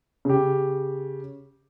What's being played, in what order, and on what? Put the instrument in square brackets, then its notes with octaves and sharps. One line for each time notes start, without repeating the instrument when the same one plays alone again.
[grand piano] C#3 G4